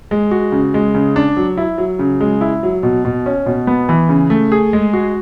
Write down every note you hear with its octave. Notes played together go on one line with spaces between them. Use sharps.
G#3
F#4
C#3
G#3
C#3
D4
F#3
E4
F#3
C#3
G#3
E4
F#3
B2
B2
C#4
B2
B3
E3
C#3
A3
G#4
G#3
F#4